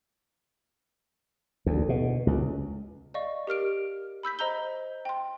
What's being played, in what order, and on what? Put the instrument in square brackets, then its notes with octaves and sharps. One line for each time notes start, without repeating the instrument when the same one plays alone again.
[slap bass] D2
B2
C#2
[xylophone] D5 D#5 F5 C#6
G4 A#4 F6 D7
B5 E6 G6 B6
C5 D#5 A#5 G6 G7
G5 C6